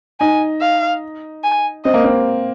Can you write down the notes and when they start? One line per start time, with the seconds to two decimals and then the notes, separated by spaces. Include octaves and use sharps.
0.20 D#4 G#5
0.61 F5
1.44 G#5
1.85 C4 D#5
1.94 A#3
2.04 C4